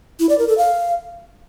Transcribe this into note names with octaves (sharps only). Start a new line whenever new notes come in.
E4
D5
A#4
A4
F5